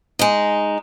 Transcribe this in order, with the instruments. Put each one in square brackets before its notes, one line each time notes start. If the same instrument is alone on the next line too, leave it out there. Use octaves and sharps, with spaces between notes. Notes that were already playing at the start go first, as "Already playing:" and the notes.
[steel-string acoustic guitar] G#3 D#4